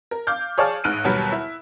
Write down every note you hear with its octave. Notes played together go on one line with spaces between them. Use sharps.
A#4
F5 D6 F6 G6
G#4 C#5 D5 F5 A5 F6
A1 G#2 F6 F#6 D7 D#7
D#2 B2 F#3 G3
E4